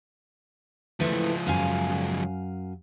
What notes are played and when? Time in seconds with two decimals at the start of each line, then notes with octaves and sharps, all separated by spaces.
1.00 C#2 E3 F3 A3
1.47 F#2 F5 G#5